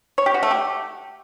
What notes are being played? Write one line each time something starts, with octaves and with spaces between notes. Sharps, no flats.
C#5
G4
F#4
A3
G4